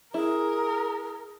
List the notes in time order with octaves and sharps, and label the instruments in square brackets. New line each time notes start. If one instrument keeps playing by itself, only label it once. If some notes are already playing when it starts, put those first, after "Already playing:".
[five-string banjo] E4 [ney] G#4 [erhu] A#4